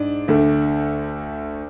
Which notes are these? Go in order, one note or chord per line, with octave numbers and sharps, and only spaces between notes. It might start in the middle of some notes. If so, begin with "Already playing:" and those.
Already playing: G#2 D4
D2 D3 A3